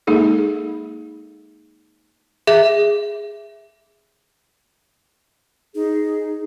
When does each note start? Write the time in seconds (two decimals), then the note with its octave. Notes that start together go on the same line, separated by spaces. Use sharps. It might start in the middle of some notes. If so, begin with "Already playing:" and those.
0.07 G#3 A#3 D#4 G#4 A4
2.47 G#4 E5
5.75 D#4 G#4